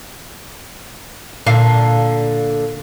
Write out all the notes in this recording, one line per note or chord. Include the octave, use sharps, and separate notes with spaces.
A#2 D3 F5